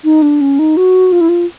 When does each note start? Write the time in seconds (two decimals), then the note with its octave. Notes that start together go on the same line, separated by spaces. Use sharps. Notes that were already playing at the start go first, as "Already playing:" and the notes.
0.04 D#4
0.22 D4
0.41 C#4
0.59 D#4
0.77 F#4
1.12 F4
1.21 E4
1.29 F4